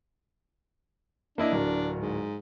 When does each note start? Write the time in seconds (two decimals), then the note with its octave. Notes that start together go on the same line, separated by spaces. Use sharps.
1.38 A#3 D4 E4 D#5
1.52 D1 A#4
1.99 G#2